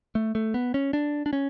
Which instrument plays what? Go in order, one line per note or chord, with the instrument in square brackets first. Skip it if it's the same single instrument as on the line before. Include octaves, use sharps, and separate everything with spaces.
[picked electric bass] A3
A3
B3
C#4
D4
D4
C#4